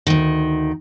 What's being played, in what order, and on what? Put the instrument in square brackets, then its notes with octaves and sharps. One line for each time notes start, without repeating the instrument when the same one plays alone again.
[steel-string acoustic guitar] D2 D#3